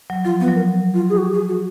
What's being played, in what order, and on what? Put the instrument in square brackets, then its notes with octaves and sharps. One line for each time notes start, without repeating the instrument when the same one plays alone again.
[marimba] F#3
[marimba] F3 [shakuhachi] F4
[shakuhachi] B3
[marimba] F#3
[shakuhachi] A#4
F4
G#4
F#4
G#4
F#4